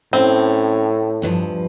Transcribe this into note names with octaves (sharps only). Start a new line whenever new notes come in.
A2 C4 C#4
E2 G2 F3